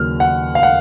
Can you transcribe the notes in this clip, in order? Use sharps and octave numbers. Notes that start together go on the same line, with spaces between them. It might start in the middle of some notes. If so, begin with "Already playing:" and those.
Already playing: D#2 C#3 F#3 F6
F#5
F5
F#5